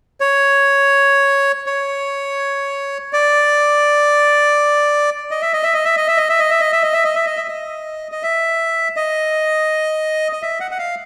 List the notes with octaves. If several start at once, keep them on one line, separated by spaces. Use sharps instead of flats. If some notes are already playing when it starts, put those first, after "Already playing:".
C#5
C#5
D5
D#5
E5
D#5
E5
D#5
E5
D#5
E5
D#5
E5
D#5
E5
D#5
E5
D#5
E5
D#5
E5
D#5
E5
D#5
D#5
E5
D#5
D#5
E5
F#5
F#5
F5